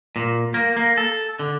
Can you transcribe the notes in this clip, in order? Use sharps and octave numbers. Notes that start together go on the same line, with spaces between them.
A#2
A#3
A#3
A4
D3